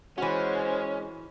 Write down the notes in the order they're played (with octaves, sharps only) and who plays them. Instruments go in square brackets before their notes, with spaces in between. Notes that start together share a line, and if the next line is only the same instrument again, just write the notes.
[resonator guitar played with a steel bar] E3 F#4 [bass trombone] G#3 [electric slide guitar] C#4 [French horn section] C5